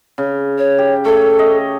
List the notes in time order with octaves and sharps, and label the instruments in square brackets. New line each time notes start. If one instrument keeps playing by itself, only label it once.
[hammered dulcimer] C#3
[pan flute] C#5
[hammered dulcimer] G4
[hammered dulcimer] A3 C#5 [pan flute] A4
[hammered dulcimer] D#5